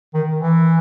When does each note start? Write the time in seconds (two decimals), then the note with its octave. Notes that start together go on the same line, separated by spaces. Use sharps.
0.14 D#3
0.39 E3